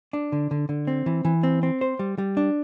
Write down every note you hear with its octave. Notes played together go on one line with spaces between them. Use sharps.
D4
D3
D3
D3
C4
E3
E3
C4
C4
C5
G3
G3
D4